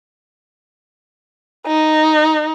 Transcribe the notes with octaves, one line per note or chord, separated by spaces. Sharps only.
D#4